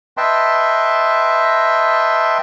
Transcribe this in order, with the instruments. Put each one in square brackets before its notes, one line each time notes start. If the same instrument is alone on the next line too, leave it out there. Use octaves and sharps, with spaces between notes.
[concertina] B4 D#5 E5 G5 A5 C6